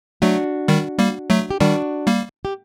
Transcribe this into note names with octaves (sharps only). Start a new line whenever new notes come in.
F#3 A3 D4 F#4
D#3 G3
G3 A#3
F#3 A3
G4
D#3 G3 D4 F#4
G3 A#3
G4